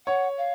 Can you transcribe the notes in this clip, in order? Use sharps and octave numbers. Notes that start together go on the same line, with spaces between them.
C#5 F#5
F5